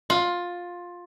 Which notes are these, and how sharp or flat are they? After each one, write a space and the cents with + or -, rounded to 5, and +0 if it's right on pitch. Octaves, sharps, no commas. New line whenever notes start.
F4 +15